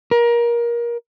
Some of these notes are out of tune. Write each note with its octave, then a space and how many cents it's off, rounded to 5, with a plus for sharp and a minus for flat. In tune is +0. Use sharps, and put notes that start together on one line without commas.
A#4 +25